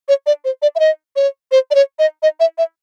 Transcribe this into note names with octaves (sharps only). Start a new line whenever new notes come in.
C#5
D5
C5
D5
E5
D#5
C#5
C5
D5
C#5
D#5
D#5
E5
E5